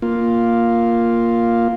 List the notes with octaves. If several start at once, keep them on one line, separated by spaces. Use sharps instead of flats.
A#3 F4